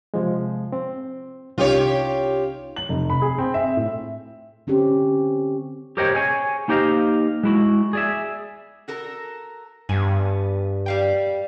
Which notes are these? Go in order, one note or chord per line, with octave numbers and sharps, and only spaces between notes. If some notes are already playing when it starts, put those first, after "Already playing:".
C3 F3 G#3
C4
C2 C#4 D#4 F4 G4 C#5
F#7
F1
B5
G#4
C4
E5
A2
D3 C4 C#4 G4
G4 A#4 C5 C#5 D#5 G5
G#4 C#5 G#5
A#3 D#4 G4 C5 D#5 F5
G#3 E4 F#4
G#4 D5 E5
F#4 A4 A#4
G2 B3 G#5
G3 F5 G5